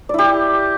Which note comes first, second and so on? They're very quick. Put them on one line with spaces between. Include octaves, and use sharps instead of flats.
D5 E4 G4